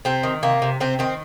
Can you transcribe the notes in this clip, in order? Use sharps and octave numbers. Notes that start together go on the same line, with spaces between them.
C3 C4
D#3
C3 A#3
C3
C3 C4
D#3 C4